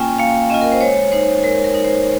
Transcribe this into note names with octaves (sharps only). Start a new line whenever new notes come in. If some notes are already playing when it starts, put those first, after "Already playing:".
Already playing: A#3 C#4 F4 G5 G#5
A#3 F5
C#4 F4 D#5
A#4
C5
G#3 C#5
D#4 C5
G#3 A#4
A#4
D#4
C5